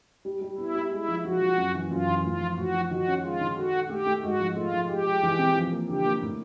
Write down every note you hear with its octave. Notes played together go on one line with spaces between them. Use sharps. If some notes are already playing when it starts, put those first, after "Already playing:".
G3
G3
B3 E4
G3
G#3 E4
F3
F3 F#4
F3
F#2
E3
F#2 F4
E3
A2 F4
F3
A2 F#4
F3
D#3 F#4
C#4
G#3 F4
D#3
F#4 A4
A4
A3 G4
A3
G#2 F#4
F3
A3 F4
F3
G#3 G4
G#3
E3
C4
F3
A#3
D3 G4
A#3
A2